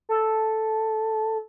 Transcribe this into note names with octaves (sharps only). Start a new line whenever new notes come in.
A4